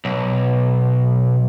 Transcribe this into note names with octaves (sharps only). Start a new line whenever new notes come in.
B1